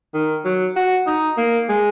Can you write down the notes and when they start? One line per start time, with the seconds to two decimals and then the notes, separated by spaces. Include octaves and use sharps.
0.14 D#3
0.45 F#3
0.76 F#4
1.07 D#4
1.37 A#3
1.69 G#3